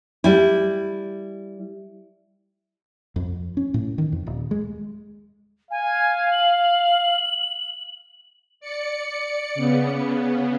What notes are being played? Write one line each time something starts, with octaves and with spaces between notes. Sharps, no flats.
G3 E4
F2
C#4
A2
D#3
F2
D#1
G#3
F5 G#5
F#7
D5 C#7
C#3 B3